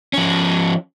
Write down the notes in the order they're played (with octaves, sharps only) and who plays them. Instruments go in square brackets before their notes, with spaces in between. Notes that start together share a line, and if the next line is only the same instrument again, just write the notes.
[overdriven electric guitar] F3 C#4